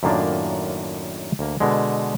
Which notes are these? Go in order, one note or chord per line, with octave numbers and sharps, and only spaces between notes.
F#2 A2 D#3 A#3 D4 F4
D2 A#3
B2 D3 G#3